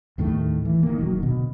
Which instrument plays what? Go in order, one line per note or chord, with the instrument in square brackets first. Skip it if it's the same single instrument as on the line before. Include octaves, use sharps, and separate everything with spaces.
[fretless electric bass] D#2 A2 D#3 A3
E3
D#3 A#3
E1 D#3 F#3
B2 D3